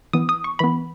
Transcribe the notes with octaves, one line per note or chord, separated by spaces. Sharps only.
E3 B3 D#6
D#6
C#6
E3 B3 B5